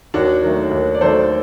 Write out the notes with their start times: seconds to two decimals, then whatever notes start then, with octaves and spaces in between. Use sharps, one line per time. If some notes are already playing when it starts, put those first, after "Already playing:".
0.14 D#2 D4 F#4
0.43 D#3 F#3 A3
0.71 D#2
0.95 D5
1.01 D#3 F#3 A3 A4 C5